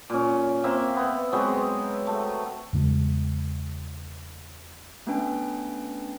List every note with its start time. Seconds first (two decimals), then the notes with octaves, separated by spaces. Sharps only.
0.10 A#2 C#4
0.64 A#3 C4 E5
0.96 B3
1.32 F#3 G#3 B3 C4
2.07 A3
2.73 E2 C#3 G#3
5.07 A3 B3 C#4 D4 B4 G5